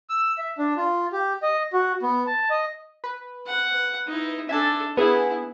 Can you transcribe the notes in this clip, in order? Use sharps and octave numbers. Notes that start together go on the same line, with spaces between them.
E6
E5
D4
F4
G4
D#5
F#4
B3
A5
D#5
B4
F#5
D#4 E4
D4 A4 E5 G#5 A5
B3 E4 G#4